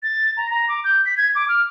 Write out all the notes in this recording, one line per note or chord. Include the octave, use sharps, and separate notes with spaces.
A6
A#5
A#5
D6
G6
B6
G#6
D6
F6